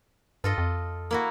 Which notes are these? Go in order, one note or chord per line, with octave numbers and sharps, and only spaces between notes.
G2 F4 A4 D#5
F2
A#3 E4 F#4